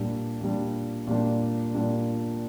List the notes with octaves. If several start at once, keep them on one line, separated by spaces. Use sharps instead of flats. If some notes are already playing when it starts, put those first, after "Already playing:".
Already playing: A#2 G3 D4
A#2 G3 D4
A#2 G3 D4
A#2 G3 D4